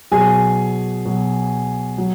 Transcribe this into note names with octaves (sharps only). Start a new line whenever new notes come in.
B2 F#3 G#4 G#5
B2 F#3
F#3